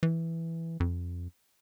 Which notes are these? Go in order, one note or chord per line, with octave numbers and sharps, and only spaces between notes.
E3
F2